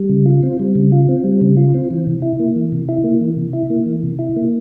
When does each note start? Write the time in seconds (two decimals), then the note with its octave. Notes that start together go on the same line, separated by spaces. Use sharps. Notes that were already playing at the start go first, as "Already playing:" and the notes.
Already playing: G3
0.09 C#3
0.26 F4
0.43 C4
0.59 G3
0.75 C#3
0.92 F4
1.09 C4
1.24 G3
1.41 C#3
1.57 F4
1.74 C4
1.91 E3
2.07 C3
2.22 E4
2.39 A#3
2.56 E3
2.72 C3
2.89 E4
3.04 A#3
3.21 E3
3.37 C3
3.53 E4
3.70 A#3
3.86 E3
4.03 C3
4.19 E4
4.36 A#3